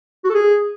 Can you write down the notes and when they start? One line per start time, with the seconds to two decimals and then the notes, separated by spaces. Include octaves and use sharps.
0.24 F#4
0.30 A4
0.35 G#4